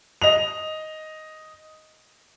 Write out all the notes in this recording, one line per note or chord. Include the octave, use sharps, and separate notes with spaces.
D#5 F7